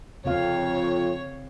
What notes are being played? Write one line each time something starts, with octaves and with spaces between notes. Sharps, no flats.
F2 C#3 C4 F4 C#5 F5